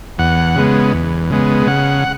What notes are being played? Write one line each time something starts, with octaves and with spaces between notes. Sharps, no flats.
E2 F#5
C#3 G#3 B3
E2
C#3 G#3 B3
C#3 F#5